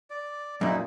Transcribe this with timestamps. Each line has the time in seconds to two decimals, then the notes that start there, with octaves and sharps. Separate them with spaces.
0.10 D5
0.61 F#2 A#2 A#3 D#4 E4